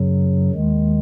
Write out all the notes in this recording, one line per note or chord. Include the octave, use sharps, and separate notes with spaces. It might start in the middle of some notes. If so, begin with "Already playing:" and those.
Already playing: F#2 C#3 F#3
D#2 D#3 G#3